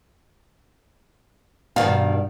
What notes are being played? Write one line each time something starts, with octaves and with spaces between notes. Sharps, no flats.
G2 B2 D#3 F5